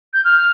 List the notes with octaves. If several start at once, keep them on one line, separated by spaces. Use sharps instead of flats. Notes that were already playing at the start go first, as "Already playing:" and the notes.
G6
F6